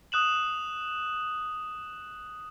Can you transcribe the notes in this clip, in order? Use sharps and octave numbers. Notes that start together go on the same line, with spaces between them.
D#6 F#6 E7 F#7